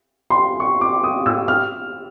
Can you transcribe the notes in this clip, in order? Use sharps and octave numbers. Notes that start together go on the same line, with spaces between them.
C6
C#6
D6
D#6
E6
F6